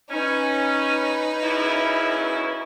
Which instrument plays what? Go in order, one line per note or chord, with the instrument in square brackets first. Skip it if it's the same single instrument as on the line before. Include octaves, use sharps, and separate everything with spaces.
[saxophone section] C#4 [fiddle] D#4 B4
[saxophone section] F#2 C#3 E4